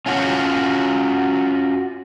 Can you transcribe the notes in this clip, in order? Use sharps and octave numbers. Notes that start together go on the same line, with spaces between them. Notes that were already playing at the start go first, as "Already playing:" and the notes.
C#4 F4 F#4 C5 C#5